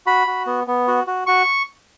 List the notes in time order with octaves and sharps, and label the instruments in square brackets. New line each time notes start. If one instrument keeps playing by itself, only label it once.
[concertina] F#4 B5
F#4
B3
B3
F#4
F#4
F#4 C#6